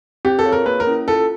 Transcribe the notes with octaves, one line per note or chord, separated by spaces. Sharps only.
C4 G4
A4
F4 G#4 C#5 F5
A#4
A#3 B4
A#4
C#4 E4
F4 A4